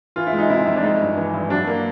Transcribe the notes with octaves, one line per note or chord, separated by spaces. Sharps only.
E3 F4
E4
G#3
D#4
C3 E4
F2
D4
G#3 D#4
G2
E3
G2
F#3 D4
A#3